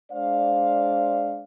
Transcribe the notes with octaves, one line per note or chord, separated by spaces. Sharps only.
G#3 D4 C5 D5 F5